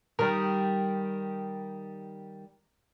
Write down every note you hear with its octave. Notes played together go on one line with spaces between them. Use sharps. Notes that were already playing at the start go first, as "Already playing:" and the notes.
D#3 G3 A#4